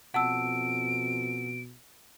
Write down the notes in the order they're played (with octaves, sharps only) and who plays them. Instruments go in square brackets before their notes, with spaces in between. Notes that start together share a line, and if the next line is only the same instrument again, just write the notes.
[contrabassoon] F2 [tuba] B2 [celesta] F#5 A5 E6 [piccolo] D7